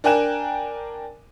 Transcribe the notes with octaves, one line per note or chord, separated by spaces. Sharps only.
D4 A#4 G5 G#5 F#6 E7